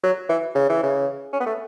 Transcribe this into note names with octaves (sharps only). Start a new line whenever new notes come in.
F#3
E3
C#3
E3
C#3
C#4
B3
A3